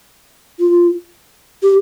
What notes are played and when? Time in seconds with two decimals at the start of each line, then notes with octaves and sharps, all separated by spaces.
0.60 F4
1.63 G4